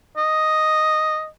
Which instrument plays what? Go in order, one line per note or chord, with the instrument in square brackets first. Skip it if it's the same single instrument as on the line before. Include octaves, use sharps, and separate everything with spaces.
[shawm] D#5